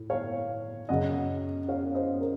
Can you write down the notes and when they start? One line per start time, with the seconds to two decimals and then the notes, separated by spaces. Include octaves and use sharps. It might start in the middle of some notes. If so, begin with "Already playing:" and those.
Already playing: A2
0.10 C#5 F5
0.89 F#2 C#3 D#5 F#5
1.69 C#5 F5
1.95 C5 D#5
2.20 A#4